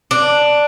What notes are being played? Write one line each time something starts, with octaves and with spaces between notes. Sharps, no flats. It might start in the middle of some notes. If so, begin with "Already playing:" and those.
D4